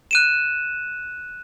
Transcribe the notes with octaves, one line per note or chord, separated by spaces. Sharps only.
F#6 D#7 E7